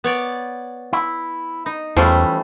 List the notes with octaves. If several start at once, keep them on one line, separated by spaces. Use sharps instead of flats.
B3 C#5 D5
E4
D#4
E2 E3 F3 G3 A3 C#4 E4 C5